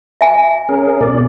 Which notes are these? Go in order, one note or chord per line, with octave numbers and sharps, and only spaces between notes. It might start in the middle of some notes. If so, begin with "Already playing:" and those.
E5 G#5
C#4 G#4 A#4
B2 D5